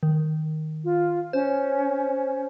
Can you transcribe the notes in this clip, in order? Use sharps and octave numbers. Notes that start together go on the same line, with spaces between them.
D#3
F4
C#4 C5